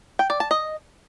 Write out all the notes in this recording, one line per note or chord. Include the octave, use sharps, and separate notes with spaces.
G5
D5
A5
D#5